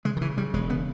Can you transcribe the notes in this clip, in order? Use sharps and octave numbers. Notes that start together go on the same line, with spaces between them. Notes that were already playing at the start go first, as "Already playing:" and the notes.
C#3 G#3
D#3
C#3 E3
C#3 G3
E1 G#3
C#3 B3